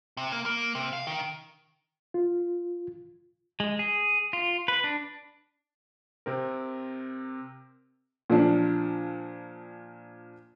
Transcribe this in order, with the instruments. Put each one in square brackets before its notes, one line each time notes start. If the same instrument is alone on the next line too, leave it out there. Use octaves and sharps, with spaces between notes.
[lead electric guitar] C3
A#3
A#3
C3
F5
D#3
[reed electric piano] F4
[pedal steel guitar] G#3
G#4
F4
B4
D4
[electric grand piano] C3 C4 A#4
[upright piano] A#2 F3 D4